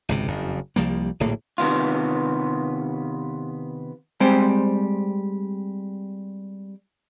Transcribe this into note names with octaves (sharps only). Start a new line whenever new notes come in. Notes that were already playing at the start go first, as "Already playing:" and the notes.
G#1 C#2 C3
F#1 F2
C2 F3 G3 A#3
D1 A#1 A2 A#3
C3 D#3 B3 F4
G3 G#3 C4 G4 C5